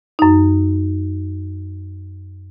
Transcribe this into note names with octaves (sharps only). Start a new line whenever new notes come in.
F#2 D#4